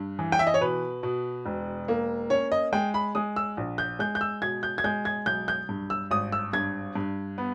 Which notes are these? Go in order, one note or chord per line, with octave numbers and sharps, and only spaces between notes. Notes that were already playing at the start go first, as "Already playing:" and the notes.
Already playing: G2
E3
G5
E5
D#5
C#5
B2 B4
B2
E1
A#3
C#4 C#5
D#5
G#3 G5
B5
G#3 D#6
E6
A#1
G6
G#3 G6
G6
E6
B2 G#6
G6
G#6
G#3 G6
G#6
B1 G6
G6
G2
E6
G#1 D#6
E6
G2 G#6
G2
B3